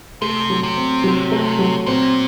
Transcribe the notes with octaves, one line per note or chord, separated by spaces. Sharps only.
C3 A3
F#3
C3
C4
F#3
A3
F#3
A#2 C4